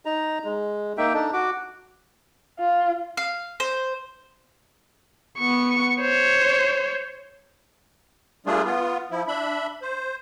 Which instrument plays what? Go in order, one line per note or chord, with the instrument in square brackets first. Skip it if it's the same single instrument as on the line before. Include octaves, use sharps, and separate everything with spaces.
[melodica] D#4 A#5
G#3
A#3 D#4 E5 G5
D4 D#4 A4
F#4 D6
[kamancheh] F4
[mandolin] F5
C5
[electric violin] B3 C#6
C5 C#5
[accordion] G3 A3 A#3 D4 F4 G#4
B3 F4
F3 E4
D4 E5 B5
C5